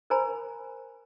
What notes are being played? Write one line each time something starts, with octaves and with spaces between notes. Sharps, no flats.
A#4 C5 G#5 A#5 B5